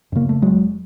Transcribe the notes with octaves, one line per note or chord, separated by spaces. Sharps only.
F#2 C#3 A#3
A3
F1 F#3 G#3